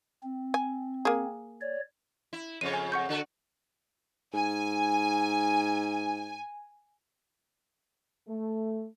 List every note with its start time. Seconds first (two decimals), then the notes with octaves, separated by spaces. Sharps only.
0.23 C4
0.54 G#5
1.05 A#3 G#4
1.61 C#5 D5
2.33 E4
2.61 F2 C#3 C#5 D#7
2.73 G#5
2.92 F#5 C#6 G6
3.09 D3 F#4 A4
4.34 G#2 G#5
8.28 A3